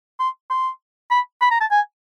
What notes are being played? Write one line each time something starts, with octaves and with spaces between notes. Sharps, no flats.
C6
C6
B5
B5
A#5
A5
G#5